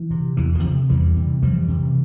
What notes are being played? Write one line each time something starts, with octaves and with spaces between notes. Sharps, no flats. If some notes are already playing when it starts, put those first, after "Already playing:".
Already playing: E3
C3
E2 E3
D3 F3
C3
E2 E3 G3
C3
F2 E3 G3
C3